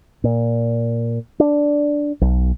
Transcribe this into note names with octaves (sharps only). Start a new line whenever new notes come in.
A#2
D4
B1